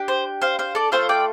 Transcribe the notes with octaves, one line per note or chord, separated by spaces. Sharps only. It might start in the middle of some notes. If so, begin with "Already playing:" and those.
Already playing: D4 G4
C5
C5 F5
C5 F5
A4 D5
A3 C4 F4 A4 C5 F5
D5 G5